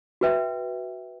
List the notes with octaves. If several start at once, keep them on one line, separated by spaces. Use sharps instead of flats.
F#4 B4 E5 G5